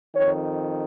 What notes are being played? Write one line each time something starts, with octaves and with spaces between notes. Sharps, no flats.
F2 D#3 C#5